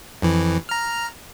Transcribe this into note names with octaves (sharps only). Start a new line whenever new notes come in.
F2 E3
A#5 F6